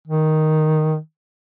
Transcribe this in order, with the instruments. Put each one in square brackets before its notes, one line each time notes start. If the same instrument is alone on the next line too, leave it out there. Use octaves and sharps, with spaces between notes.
[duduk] D#3